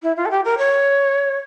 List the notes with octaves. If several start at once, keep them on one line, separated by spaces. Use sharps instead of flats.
E4
F4
A4
G4
A#4
C#5